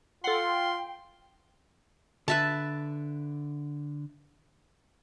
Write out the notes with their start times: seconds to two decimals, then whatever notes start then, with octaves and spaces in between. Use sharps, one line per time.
0.24 F4 A4 F#5 G5 C6
2.28 D3 B4 E5 A5